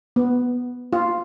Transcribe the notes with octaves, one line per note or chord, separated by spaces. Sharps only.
B3
F4